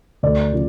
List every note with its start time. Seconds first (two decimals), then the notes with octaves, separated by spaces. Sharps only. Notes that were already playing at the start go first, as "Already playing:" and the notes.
0.23 D2 D5
0.52 C#3 F3